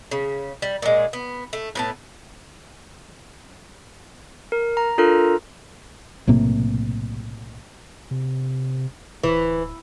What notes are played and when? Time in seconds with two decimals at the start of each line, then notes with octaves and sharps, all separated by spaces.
0.11 C#3
0.62 G3
0.82 A#2 G#3
1.13 B3
1.53 A3
1.75 A2 B3 A5
4.52 A#4
4.77 A#5
4.98 D4 F4 A4 A#4 A#5
6.27 B1 A2 C3 A#3
8.11 C3
9.24 D1 E3